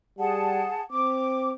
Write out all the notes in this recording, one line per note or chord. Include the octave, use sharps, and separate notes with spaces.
G3 G#4 F#5 A5
C4 D6